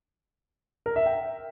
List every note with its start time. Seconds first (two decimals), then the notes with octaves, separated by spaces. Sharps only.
0.86 A#4
0.96 E5
1.06 G5